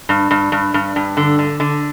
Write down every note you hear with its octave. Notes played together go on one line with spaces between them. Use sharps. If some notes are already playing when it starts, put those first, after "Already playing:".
G2
G2
G2
G2
G2
D3
D3
D3